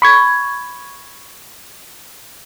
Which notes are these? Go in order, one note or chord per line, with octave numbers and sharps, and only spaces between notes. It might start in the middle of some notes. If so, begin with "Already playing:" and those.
B5 C#6 G#6